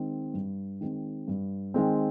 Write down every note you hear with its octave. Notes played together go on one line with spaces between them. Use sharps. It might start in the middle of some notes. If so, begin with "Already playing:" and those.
Already playing: D#3 G#3 C4
G2
D#3 G#3 C4
G2
D#3 G#3 C4